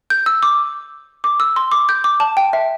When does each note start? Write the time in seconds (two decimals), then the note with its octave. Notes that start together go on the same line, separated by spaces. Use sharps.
0.10 G6
0.26 E6
0.43 D6
1.24 D6
1.40 E6
1.56 C6
1.72 D6
1.89 G6
2.04 D6
2.20 A5
2.37 G5
2.53 E5